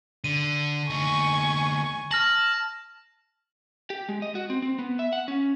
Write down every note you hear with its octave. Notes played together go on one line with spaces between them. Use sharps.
D3 D#7
D2 D#4 G#5 C#6
A5 F6 A#6 F#7
G4
G#3
D#5
F#4
C4
C4
B3
E5
F#5
C#4